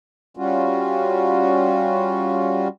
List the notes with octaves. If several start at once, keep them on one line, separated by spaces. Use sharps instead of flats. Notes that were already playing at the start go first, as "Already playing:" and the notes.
G3 C#4 F4 F#4